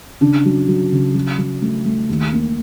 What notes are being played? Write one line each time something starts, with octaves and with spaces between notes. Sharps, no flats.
C#3 D4
F#3
F#3
C#3
F#3
F#3
A3
A3
D#2
A#3